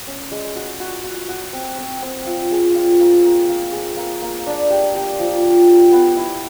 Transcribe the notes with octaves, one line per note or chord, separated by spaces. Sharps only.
C#4
G#3
F#4
F#4
F#4
F#4
C4
C4
C4
F4
G#4
F4
A#3
A#3
A#3
G#4
A#3
A#3
D4
G4
G4
F3
F3
G4
B3
E4